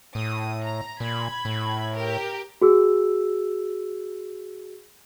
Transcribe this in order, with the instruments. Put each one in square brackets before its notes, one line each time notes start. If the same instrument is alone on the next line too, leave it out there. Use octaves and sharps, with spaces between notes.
[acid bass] A2 [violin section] D#6
[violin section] A#5
[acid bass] A#2 [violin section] B5 G#6
[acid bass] A2
[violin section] G4 A#4
[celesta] F#4 G#4 E6